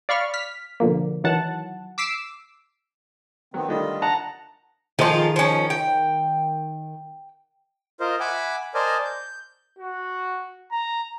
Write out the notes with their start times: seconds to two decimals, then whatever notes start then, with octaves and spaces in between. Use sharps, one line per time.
0.09 D5 F5 B5 C#6 F6
0.34 F6 B6
0.80 B2 D3 F3 A#3
1.24 D#3 E3 F#3 F#5 A5
1.98 D6 E6 B6 C7 D7 E7
3.54 D#3 F#3 B3 C4
3.68 D3 D#3 G3 A3 F4 D#5
4.02 F#5 A5 A#5
4.99 D#3 F3 D#4 F4 G#4
5.36 F3 C#4
5.70 G5
8.00 F4 A#4 C5 D#5
8.20 E5 F#5 G#5 B5 D6
8.74 A#4 C5 D5 D#5 G#5 A5
9.05 G6
9.79 F#4
10.72 A#5